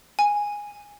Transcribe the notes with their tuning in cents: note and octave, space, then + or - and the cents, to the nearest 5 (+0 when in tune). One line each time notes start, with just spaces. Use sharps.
G#5 -10